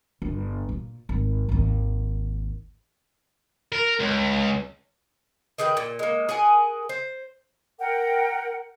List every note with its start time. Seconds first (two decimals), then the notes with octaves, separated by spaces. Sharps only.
0.22 G1
0.69 A#2
1.09 G#1
1.49 G#1 D#2
3.72 A#4
4.00 C#2
5.58 D#3 G#4 B4 G5
5.77 A#2
5.99 G#3 A#3
6.29 G#4 A#4 F#5 G#5
6.89 C5
7.79 A#4 F#5 G5